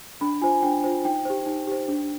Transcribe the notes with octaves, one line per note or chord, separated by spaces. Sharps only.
D4 B5
F4 C5 G#5
D4 G5
F4 C5
D#4 G5
G4 C5
D#4
G4 C5
D4